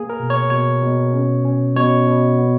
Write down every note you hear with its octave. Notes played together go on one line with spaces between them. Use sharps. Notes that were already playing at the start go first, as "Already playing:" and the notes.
Already playing: A#3 G#4
A#4
B2
C#5
B2 C#5
B2
C#4
C#4
B2 C#5
B2
B3